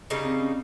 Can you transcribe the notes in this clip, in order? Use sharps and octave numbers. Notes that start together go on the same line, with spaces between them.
C#3 G3 A#3 D#4
C4
C#4